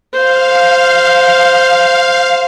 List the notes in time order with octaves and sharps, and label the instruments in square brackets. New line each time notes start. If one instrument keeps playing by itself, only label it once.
[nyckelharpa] C5 [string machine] F5